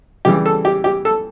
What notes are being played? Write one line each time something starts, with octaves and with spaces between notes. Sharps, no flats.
C#3 E3 G3 G4
A4
G4
G4
A4